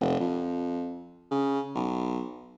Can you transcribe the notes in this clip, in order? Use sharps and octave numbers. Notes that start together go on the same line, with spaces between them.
F1
F2
C#3
B1